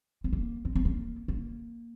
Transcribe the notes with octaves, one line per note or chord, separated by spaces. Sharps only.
C4
A#3
C4
C4
A#3
A#3